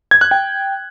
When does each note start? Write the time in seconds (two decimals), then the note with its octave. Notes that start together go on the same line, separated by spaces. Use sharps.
0.11 G#6
0.21 F#6
0.31 G5